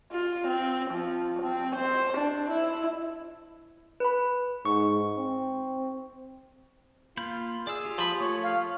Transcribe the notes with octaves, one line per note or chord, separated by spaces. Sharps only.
F4
C4
F3
C4
C5
D4
E4
B4 B5
G#2 C#6
C4
A#3 F4 B5 G6
G#4 D5 F5 E6
F4 G4
F3 B5
A3 C#5
F5